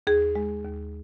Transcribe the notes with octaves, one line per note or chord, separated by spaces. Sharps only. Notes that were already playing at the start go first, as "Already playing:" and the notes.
D#2 G#4
G#3
D#2